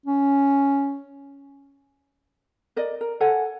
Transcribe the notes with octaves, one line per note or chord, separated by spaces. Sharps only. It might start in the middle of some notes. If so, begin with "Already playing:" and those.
C#4
A#4 D5 D#5
A#4
A4 C#5 F#5 G#5